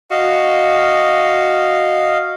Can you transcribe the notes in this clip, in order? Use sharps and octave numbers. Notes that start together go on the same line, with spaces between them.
F#4 D#5 F5